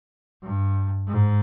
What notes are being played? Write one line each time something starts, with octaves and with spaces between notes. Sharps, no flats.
G2
G#2